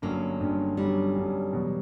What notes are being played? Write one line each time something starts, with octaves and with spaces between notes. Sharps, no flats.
G1 G2 F#3 A#3 C#4
G1 G2 F#3 C#4
G1 G2 F#3 G3 C#4
G1 G2 F#3 C#4
E2 B2 F#3